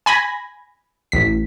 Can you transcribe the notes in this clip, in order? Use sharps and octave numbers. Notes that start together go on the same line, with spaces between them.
G#5 B5 G#6 A#6
A1 B6